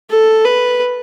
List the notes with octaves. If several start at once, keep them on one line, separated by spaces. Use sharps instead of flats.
A4
B4